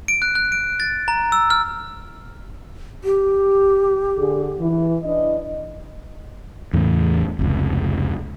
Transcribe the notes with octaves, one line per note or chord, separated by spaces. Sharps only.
D7
F#6
F#6
D7
A6
A#5
E6
F6
G4
D3 G#4
E3
E3 D4 D#5
E2 A2 C#3
F1 C#2